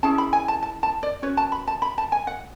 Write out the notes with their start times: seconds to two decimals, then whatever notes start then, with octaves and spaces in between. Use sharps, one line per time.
0.03 C#4 E4 G#4 A5
0.18 B5
0.33 G#5
0.48 A5
0.63 A5
0.83 A5
1.03 D5
1.22 C#4 F#4 B4 C#5
1.37 A5
1.52 B5
1.68 A5
1.82 B5
1.98 A5
2.12 G#5
2.27 F#5